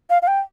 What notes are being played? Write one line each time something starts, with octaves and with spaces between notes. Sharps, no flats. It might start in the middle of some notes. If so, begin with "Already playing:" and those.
F5
F5
G5